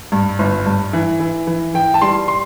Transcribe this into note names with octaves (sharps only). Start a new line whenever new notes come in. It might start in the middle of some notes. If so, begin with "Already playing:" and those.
G2
G1
G2
E3
E3
E3
E3 G5
A5
G3 C6
C6